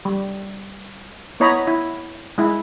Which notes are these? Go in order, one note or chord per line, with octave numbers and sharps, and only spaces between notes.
G3
B3 E4 C#5 D#5 A#5 B5
E4
G#3 E4